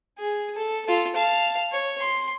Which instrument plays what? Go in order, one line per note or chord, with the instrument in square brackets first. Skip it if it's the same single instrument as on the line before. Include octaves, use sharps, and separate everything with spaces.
[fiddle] G#4
A4
F4 A4
F5 A5
C#5
C6